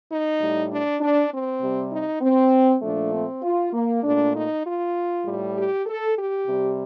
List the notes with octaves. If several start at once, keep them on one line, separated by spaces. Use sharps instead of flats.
D#4
A2 G3
D4
D4
C4
C3 G3
D#4
C4
A#2 F3 A3 D4
C4
F4
A#3
A#2 A3 D4
D#4
F4
A2 G3
G4
A4
G4
C3 G3